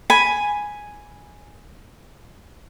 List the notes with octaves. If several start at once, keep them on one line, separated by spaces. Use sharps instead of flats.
G#5 B5